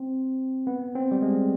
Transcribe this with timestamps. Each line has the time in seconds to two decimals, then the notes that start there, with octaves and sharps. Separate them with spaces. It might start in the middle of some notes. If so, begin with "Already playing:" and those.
Already playing: C4
0.67 B3
0.95 C4
1.11 G3
1.22 G#3